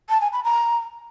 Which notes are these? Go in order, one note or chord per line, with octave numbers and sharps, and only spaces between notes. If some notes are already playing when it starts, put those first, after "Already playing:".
A5
G#5
B5
A#5